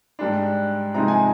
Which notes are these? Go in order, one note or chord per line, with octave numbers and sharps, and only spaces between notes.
G#2 G3 D4
C3 F3 G#3 D#4 A#5
G#5